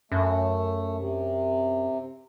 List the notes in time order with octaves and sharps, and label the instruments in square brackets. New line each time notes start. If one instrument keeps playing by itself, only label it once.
[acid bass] F#2 [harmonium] A3
[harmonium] C3